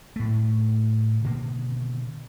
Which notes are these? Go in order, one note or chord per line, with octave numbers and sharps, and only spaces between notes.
A2 A3
B2 D3 D#3 A#3